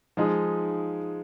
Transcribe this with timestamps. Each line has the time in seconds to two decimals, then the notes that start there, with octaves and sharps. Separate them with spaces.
0.17 F3 G#3 D#4 G#4